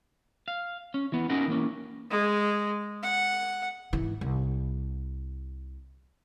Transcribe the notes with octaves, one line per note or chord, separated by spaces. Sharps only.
F5
C#4
E3 B3
C#4 D#4 F#4 A#4 F#5
E3 A#3 C#4
G#3
F#5
G#2 E3
C2